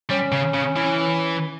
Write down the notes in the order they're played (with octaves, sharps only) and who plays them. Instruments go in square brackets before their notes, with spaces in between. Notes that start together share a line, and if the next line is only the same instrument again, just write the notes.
[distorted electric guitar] G3 [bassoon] C#4
[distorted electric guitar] C#3
C#3
E3